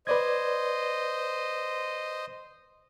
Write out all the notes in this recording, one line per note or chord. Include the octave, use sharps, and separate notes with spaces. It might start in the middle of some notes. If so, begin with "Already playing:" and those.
B4 C5 D5 D#5 G#6